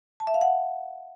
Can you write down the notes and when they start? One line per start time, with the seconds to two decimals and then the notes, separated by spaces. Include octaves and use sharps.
0.20 A5
0.27 E5
0.34 F5
0.41 F#5